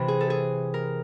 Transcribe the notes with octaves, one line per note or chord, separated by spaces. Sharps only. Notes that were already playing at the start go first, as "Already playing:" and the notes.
Already playing: C3 E3
G#4
A4
G#4
A#4